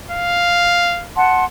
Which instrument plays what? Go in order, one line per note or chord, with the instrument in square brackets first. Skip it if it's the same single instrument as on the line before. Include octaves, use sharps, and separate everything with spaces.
[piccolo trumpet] F5
[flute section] F#5 A5 C6